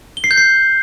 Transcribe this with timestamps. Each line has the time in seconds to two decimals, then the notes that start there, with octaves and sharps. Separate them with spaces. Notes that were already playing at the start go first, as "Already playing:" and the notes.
0.17 G7
0.24 C7
0.31 G6
0.38 C7